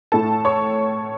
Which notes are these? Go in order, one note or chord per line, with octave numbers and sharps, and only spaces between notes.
A2 A3 E4 A4 A5
C#5 C#6